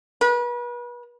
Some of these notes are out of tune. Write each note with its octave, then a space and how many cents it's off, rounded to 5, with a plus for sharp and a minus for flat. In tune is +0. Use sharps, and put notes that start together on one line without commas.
B4 -35